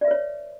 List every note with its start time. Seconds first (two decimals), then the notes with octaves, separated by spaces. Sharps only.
0.01 D5
0.05 E5
0.08 B4
0.11 C#5